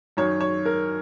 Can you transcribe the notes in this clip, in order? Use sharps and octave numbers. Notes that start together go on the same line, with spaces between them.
F#2 D#3 C#5
C#5
A#4